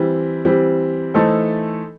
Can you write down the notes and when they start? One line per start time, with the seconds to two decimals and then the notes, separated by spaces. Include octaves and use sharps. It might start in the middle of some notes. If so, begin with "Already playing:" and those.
Already playing: E3 G3 C4
0.45 E3 G3 C4
1.14 E3 A3 D#4 A4 C5